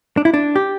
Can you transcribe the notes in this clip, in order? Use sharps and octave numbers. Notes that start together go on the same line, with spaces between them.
D4
E4
D4
G4